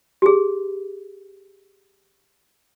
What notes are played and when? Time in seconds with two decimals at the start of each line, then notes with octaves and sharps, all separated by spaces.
0.22 G4 G#4